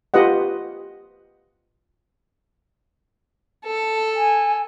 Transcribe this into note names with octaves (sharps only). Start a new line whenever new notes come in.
F4 G4 B4 D#5 F#5
A4
G#5